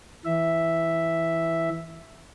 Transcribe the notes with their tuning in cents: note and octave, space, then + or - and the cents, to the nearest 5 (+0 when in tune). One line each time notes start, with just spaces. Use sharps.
E3 +0 E5 +0